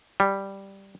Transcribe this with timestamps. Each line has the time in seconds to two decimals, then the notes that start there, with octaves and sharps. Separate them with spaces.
0.20 G3